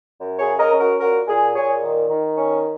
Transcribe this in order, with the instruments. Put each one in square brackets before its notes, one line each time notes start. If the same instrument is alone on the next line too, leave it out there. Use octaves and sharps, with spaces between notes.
[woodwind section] F#2
G#4 C#5
C#3
A#4 D#5
C#4
F#4 A#4
A#2 F#4 A#4
A#2 G#4
A#2 G#4 C#5
D#3
D#3
C#4